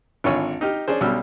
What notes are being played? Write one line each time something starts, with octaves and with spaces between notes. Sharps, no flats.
G#1 D3 F4 C#5 G#5 B5
D#4 G4 F6
C#4 D4 G#4 C5
B1 B2 G3 C#4 E6 F6